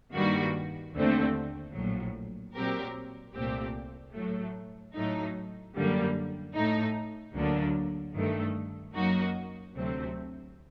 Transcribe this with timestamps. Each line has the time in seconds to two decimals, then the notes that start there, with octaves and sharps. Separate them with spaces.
0.14 G2 D#3 G3 A#3 F#4
0.93 D#2 D3 A3 C4
1.74 A#1 A2 F#3
2.54 A#2 F#3 C4 G4 A#4
3.34 C2 A#2 A3 C4 G4
4.13 A2 F#3 A3
4.94 A2 F#3 A3 D#4
5.74 F#2 D3 G3 A#3
6.54 A2 A3 D#4
7.34 D2 D3 F#3 A#3 D4
8.14 G2 D#3 A3
8.94 F#2 F#3 A#3 D#4 F#4
9.74 D2 C3 F#3 A3 C4